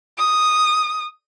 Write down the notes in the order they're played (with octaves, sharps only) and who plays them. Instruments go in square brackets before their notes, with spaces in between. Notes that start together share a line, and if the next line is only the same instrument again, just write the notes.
[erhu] D#6